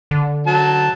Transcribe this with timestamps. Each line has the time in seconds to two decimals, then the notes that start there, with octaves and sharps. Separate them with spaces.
0.11 D3
0.47 F#3 A5